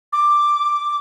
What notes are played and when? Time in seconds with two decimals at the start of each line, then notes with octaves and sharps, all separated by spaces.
0.13 D6